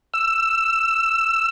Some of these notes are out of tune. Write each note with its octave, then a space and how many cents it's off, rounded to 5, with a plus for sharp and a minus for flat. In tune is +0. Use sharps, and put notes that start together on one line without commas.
E6 +15